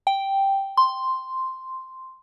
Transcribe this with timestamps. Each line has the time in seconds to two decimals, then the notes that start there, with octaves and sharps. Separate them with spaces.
0.07 G5
0.77 C6